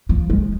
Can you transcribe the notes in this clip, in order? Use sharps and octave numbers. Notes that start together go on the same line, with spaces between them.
F3
G#3